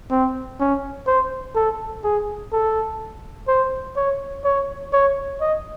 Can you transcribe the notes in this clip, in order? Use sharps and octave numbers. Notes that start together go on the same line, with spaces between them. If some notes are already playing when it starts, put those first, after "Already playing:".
C4
C#4
C5
A4
G#4
A4
C5
C#5
C#5
C#5
D#5